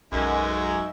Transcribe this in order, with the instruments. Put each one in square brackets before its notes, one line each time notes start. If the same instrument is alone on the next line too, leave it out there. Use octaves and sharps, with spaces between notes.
[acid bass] B1 [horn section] F#2 [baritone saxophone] G#3 [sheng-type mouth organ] D#4 E5